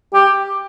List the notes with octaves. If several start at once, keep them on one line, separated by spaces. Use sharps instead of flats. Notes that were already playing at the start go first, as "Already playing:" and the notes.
G4